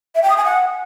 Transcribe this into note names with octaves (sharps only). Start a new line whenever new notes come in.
E5
G5
D#6
G#5
F#5